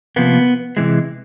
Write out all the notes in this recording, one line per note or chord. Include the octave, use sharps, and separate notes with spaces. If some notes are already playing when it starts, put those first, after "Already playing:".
C3 F3 A#3 B3
C3 E3 G#3